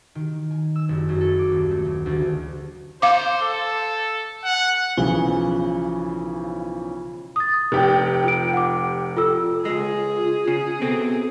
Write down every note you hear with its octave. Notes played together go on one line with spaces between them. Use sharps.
D#3
G#5
E6
F#1
F#2
A4
D6
D#1
A3
F#3
D2
D2
C5 F5 D6
A4
F#5
B1 C#3 E3 F3 G7
D#6 A6
F1 G4 G5
F4 D7
F#5 D6
F4 A4 E6
C#2 G#3 F4 G#4
C#3
B2 C4 A4